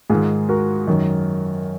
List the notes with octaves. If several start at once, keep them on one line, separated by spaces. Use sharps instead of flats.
G#2 D#3 F4 G#4
F#4 A#4
F#2 D#3